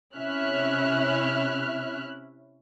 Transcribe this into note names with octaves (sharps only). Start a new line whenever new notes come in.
C3 C#4 E4 E5 F6 F#6